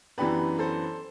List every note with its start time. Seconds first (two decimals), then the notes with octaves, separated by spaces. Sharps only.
0.18 F#2 E3 B3 D4 G4 B4
0.59 A4 C5